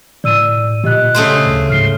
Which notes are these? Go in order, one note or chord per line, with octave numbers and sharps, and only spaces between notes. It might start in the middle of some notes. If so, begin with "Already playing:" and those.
A2 D5 E6 D#7
A#2 G4 D#5 F#6
C#3 A3 C5
D2
G#2 F6 C7 G7